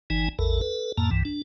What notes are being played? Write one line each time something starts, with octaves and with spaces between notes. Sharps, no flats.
G1 E3 D#4 G#5
A1 E2 A4 A#4
A4 B4
F2 A2 A#3 A5 A#5
C2 G2 E3
D4